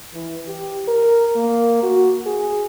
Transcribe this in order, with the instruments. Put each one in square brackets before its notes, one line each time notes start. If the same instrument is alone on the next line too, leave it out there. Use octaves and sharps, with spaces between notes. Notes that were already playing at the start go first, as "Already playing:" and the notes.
[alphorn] E3
G4
A#4
A#3
F#4
G#4